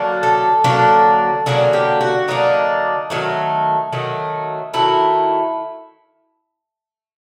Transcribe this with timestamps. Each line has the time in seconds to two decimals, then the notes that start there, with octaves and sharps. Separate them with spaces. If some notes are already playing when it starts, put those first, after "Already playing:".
Already playing: D3 F#3 A#3 D4
0.23 A4
0.64 D3 F#3 A#3 D4
1.46 D3 F#3 A#3 D4 G#4
1.73 G4
2.01 F#4
2.28 D3 F#3 A#3 D4 D#4
3.10 D#3 F#3 A3
3.93 D#3 F#3 A3
4.74 D#3 F#3 A3 E4